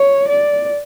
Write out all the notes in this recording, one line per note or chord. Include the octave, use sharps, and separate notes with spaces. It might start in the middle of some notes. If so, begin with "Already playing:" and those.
Already playing: C#5
D5